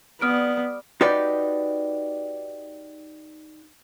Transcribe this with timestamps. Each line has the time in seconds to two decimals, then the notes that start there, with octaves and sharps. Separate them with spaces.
0.21 G3 B3 D#6 F6 D7
1.01 D#4 F#4 G4 B4 D5